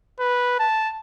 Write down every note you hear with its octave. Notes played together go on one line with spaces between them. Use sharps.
B4
A5